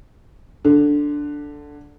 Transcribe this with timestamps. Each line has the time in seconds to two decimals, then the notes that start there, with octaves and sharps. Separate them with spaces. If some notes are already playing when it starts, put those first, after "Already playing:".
0.65 D3